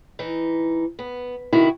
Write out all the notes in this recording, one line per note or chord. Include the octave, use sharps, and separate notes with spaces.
E3 D#4
B3
C3 D#3 E4 F#4